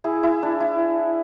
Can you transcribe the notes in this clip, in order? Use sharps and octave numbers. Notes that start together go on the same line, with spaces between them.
E4 G#4
E4
D4
E4